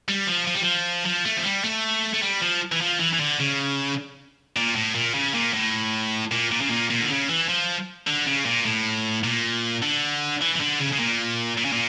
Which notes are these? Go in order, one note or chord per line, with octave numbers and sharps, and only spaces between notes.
G3
F3
F3
G3
F3
F3
A3
F3
G3
A3
A3
G3
F3
E3
F3
E3
E3
D3
C#3
A#2
A2
A#2
C#3
A#2
A2
A#2
A#2
C#3
A#2
A#2
D3
C#3
E3
F3
D3
C#3
A#2
A2
A#2
D3
E3
E3
D3
C#3
C#3
A#2
A#2
C#3
A#2